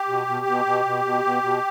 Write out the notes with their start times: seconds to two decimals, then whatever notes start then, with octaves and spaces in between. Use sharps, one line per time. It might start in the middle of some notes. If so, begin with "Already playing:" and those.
Already playing: G4
0.08 B2
0.27 B2
0.46 B2
0.65 B2
0.85 B2
1.05 B2
1.24 B2
1.43 B2